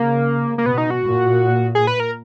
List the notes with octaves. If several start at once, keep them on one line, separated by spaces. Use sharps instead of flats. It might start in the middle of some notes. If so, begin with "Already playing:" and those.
Already playing: C#3 A#3
A#3
B2 B3
D#4
F#4
A#2
G#4
B4
A#4